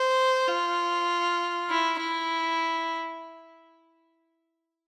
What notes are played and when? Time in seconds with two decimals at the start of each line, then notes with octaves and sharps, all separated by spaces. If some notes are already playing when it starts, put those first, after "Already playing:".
Already playing: C5
0.48 F4
1.70 E4
2.00 E4